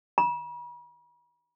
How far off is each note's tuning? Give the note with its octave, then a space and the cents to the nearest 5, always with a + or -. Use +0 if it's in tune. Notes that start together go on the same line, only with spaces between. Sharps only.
B5 -45